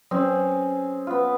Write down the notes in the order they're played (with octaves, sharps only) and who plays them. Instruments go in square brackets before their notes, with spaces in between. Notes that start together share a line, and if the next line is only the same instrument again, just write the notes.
[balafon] F#3 [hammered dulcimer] C4 C#4 G#4
[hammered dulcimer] B3 F4